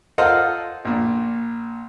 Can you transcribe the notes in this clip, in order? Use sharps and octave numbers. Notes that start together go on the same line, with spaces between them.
F4 A4 A#4 C5 D#5 F#5
A#1 A#2